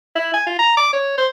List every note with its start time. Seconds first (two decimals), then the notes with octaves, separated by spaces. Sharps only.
0.16 E4
0.34 G#5
0.47 F4
0.59 A#5
0.77 D6
0.93 C#5
1.18 C5